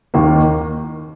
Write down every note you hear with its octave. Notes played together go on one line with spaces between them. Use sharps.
D#2 D#3 A#3